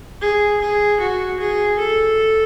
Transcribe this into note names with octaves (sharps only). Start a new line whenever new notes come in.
G#4
G#4
F#4
G#4
A4